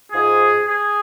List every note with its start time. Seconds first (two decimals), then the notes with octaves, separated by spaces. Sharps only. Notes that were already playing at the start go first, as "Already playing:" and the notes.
0.12 G#2 F3 G#4
0.65 G#4